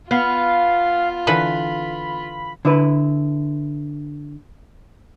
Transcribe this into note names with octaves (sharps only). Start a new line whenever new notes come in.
B3 F4 F5
D3 E3 B4 B5
D3 E4 B4